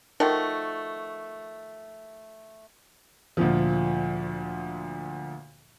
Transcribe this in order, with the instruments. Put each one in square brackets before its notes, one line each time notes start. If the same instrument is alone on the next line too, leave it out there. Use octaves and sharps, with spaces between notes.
[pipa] D#3 F3 A3 F#4
[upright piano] D2 A#2 F3